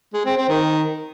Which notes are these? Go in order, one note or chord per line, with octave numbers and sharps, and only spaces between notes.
G#3
C4
C4
D#3